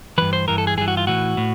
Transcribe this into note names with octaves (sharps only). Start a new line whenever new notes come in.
G2 E3 B4
C5
G2 E3 A#4
A4
G#4
G2 E3 G#4
F#4
F4
A2 E3 F#4
A2